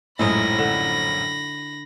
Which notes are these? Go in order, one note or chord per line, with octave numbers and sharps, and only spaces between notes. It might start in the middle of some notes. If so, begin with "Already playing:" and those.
A#1 F#2 A2 G#3 D#4 E4 B5 A#6
D3